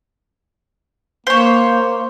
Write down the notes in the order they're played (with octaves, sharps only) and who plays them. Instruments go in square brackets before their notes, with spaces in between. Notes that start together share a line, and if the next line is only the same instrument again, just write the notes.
[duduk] A#3 [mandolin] C5 C#5